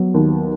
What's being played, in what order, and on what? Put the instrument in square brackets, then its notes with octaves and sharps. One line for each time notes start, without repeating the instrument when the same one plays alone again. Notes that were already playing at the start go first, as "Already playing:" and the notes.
Already playing: [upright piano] F#3 B3
D#2